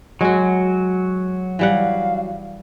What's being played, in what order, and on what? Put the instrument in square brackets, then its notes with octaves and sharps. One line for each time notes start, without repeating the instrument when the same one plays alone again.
[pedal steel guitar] F#3 [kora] G#3 F#4
[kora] E3 G3 F#5 [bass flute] F5